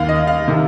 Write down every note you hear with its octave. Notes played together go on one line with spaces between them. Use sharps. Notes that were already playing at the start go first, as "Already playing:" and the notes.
Already playing: D#2 D#3 F5
D#5
F5
C3 D#3